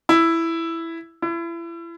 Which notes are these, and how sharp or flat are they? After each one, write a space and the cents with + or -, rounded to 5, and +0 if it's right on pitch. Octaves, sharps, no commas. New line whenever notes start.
E4 +5
E4 +35